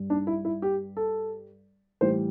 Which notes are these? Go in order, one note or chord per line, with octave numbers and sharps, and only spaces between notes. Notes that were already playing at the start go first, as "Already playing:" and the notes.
Already playing: G2 G3
D4
E4
E4
G4
A4
A2 E3 G3 C5